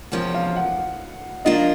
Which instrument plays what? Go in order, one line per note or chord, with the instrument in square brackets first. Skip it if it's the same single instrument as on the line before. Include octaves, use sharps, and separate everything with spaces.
[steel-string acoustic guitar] E2 C3 F3 A#3 C#4
[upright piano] F5
F#5
[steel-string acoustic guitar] F3 A#3 D4 F4 A#4 [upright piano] D#5